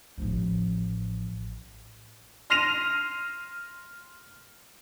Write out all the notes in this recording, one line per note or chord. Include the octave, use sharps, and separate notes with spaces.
A1 F3
C6 F6 A#6 C7 D#7 F7